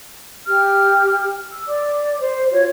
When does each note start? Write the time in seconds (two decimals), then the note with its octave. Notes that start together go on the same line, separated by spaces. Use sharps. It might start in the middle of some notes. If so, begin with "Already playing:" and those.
0.47 G4 F6
1.51 E6
1.67 D5 D6
2.19 C5
2.52 F4 F#4 C#5